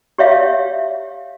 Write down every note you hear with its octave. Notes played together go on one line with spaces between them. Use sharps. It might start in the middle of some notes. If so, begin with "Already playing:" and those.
G4 C#5 E5 F5